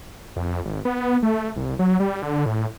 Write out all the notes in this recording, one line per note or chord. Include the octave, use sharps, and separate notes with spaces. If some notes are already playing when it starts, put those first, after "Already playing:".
F2
G#1
B3
A3
C2
F#3
G3
D3
A2